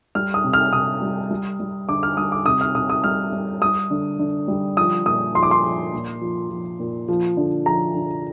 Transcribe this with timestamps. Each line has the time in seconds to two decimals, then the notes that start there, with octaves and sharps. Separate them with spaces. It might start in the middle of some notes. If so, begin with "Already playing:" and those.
0.15 G3 F6
0.34 D#6
0.44 C3
0.53 F6
0.73 C3 D#6
1.02 G3
1.30 G3
1.60 G3
1.89 D3 D6
2.03 F6
2.17 G3 D#6
2.32 D6
2.46 C3 D#6
2.61 F6
2.75 C3 D#6
2.90 D#6
3.04 G3 F6
3.33 G3
3.62 G3 D#6
3.90 D3
4.19 D3
4.48 G3
4.77 F3 D#6
5.06 A#2 D#6
5.35 F3 C6
5.43 D6
5.51 C6
5.64 F3
5.93 A#2
6.21 F3
6.50 F3
6.80 A#2
7.08 F3
7.37 D3
7.66 F3 A#5
7.95 D3